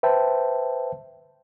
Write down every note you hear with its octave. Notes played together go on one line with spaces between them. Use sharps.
B4 C5 E5 G5 A5